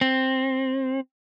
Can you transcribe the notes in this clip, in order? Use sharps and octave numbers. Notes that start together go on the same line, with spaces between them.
C4